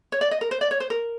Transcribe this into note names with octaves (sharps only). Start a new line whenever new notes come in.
C#5
D5
D#5
A#4
C5
D5
C#5
C5
A#4